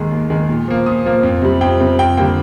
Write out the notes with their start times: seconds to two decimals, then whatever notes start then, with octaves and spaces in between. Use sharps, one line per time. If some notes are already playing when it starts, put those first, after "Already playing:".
Already playing: D#2 D#3 G#3
0.11 D#2
0.30 D#3 G#3
0.49 A#2
0.68 F3 A#3
0.86 A#2 D#6
1.05 F3 A#3
1.23 F2
1.42 C3 G3
1.61 F2 G5
1.80 C3 G3
1.99 F2 G5
2.17 D3 G3 A#3 G5